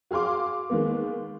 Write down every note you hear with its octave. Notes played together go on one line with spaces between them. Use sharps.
F#4 G#4 F5 C6 D6
D#3 G#3 A#3 B3